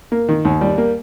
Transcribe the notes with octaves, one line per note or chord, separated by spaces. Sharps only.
A#3
D#3
D#2
G3
A#3